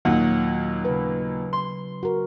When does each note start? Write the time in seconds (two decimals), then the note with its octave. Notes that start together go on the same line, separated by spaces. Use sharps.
0.05 D#2 A#2 F#3 F#5
0.85 C#3 B4
1.53 C6
2.03 F#4 A#4